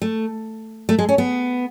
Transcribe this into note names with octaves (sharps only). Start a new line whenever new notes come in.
A3
A3
G#3
C#4
B3